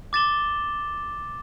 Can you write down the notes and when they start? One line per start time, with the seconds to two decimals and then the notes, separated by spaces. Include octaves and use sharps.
0.13 D6 A6 E7 G7